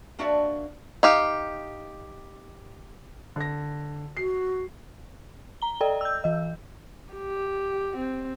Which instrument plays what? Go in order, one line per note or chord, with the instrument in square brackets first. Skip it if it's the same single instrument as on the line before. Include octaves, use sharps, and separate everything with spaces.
[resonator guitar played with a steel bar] A#3 D4 F#4 D5 E5 A5
[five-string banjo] D#4 G4 F5
[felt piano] D3 A#6
[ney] F#4 [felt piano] C7
[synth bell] A#5 G7
A4 D5 D#5 G5
E6 G6
E3 D#5
[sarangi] G4
C4